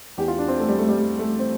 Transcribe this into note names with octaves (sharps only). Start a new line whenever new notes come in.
E2 E3 G4
F4
D4
C4
A3
G3
A3
G3
G3
A3
C4